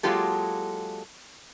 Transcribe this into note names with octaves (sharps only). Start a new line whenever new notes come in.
F#3 G#3 A#3 F4 G4 A4